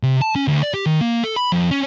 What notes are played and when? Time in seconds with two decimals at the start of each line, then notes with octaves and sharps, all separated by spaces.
0.03 C3
0.21 A5
0.35 C#4
0.48 D2
0.63 D5
0.74 G4
0.86 D#3
1.01 A#3
1.24 A4
1.36 B5
1.52 F2
1.71 C#4